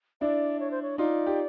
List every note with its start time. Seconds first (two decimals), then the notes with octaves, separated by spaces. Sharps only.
0.21 D4 E4 D5
0.60 C#5
0.71 C5
0.82 C#5
0.98 D#4 F4 D5
1.27 G4